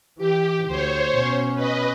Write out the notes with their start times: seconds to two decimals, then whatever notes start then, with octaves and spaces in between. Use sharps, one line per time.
0.18 E3 G4
0.67 D2 C5 C#5
1.15 B2 C#4
1.55 B4 D#5